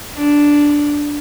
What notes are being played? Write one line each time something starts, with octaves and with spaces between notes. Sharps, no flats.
D4